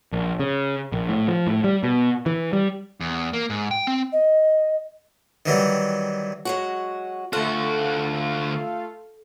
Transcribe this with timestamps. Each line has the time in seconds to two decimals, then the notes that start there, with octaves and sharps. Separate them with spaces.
0.13 A#1
0.40 C#3
0.92 A#1
1.09 A2
1.28 F3
1.47 A2
1.64 G3
1.83 B2
2.26 E3
2.53 G3
3.00 E2
3.33 A#3
3.50 G#2
3.71 G5
3.87 C4
4.12 D#5
5.46 D#3 E3 F#3 G3
6.45 F#3 G#3 F#4
7.33 D2 A3 F4 F#4 A4